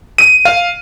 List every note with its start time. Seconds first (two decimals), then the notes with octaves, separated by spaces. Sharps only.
0.18 D#7
0.45 F5